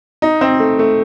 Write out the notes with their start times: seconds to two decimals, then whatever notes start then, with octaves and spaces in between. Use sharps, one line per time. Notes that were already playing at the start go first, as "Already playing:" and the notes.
0.22 D#4
0.41 C4
0.60 A3
0.79 A3